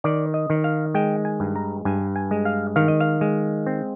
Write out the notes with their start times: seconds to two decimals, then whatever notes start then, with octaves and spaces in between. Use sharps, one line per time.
0.04 D#3 D5
0.34 D#5
0.50 D#3
0.64 F5
0.94 G#3 G5
1.25 G#5
1.40 G2
1.56 A#5
1.85 G2 G#5
2.16 G#5
2.31 G#3
2.45 F5
2.76 D#3 F5
2.88 D#5
3.00 F5
3.21 G#3
3.66 C4